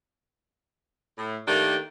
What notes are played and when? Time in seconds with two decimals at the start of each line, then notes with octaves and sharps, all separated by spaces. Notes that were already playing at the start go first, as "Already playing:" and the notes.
1.18 A2
1.48 D#3 A3 A#3 D4 G4